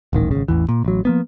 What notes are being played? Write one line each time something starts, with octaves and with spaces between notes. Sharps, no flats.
D#1 A1 D#3
G#1 C#3
A1 E2 E3
A#2
A1 F#3
F3 A#3 B3